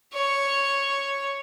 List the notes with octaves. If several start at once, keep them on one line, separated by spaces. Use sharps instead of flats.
C#5